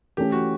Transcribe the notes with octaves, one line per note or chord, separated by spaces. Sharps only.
E3 A3 C#4 E4 G4 A4
F#4